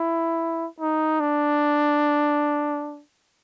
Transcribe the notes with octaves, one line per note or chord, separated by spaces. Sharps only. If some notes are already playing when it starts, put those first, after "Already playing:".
Already playing: E4
D#4
D4